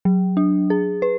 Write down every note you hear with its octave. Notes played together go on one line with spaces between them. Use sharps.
F#3
D4
G#4
B4